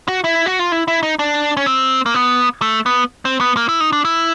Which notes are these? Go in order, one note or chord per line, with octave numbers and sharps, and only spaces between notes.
F#4
E4
F#4
F4
E4
E4
D#4
D4
C#4
C4
A#3
B3
A3
B3
C4
B3
A#3
E4
D#4
D4
E4